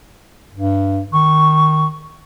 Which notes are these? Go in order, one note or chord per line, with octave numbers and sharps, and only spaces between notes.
G2
D#3 C#6